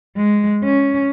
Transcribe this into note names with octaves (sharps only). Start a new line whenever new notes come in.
G#3
C#4